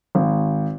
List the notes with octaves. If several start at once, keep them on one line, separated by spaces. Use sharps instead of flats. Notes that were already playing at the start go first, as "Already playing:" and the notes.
G#1